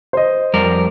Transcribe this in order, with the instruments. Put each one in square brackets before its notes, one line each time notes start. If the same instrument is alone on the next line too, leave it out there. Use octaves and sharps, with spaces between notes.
[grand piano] C5 D#5
[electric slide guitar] F2 G3 A#4